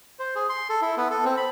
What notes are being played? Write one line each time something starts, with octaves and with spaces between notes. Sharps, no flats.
C5
G#4
C6
A4
E4
B3
A4
C4
B5